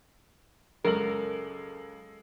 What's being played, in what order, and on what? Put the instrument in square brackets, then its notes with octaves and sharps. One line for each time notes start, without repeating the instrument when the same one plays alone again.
[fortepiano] C#2 F#2 [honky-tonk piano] G#3 A4 F#7 [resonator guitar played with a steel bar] A#4